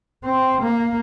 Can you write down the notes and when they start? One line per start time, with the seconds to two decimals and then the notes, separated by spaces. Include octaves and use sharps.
0.24 C4
0.62 A#3